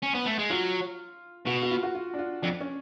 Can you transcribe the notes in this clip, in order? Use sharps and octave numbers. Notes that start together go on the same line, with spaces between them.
C#4
B3
A3
G#3
F#3 F4
B2 F#4
F#4
F4
F#4
F4
D4
F4
F2 D4
C#4